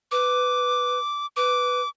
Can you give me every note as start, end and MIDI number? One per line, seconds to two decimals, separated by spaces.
0.11 0.99 71
0.11 1.26 86
1.37 1.81 71
1.37 1.89 86